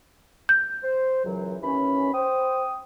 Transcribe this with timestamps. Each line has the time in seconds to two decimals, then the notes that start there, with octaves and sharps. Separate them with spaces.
0.49 G6
0.83 C5
1.25 C#2 F#2 E3 F#3
1.63 D#2 E3 C#4 B5
2.13 C5 G5 D#6